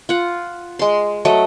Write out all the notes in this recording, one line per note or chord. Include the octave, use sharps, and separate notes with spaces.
F4 F#5
G#3 C6
F#3 A3 D#5